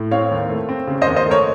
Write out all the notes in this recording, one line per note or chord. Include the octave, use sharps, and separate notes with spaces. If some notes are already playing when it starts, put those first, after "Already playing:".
Already playing: A2
C4 C#5 F5
D#2
A3
C4
C#3
C5 D#5
D#2
C5 D#5
A3 A#4 C#5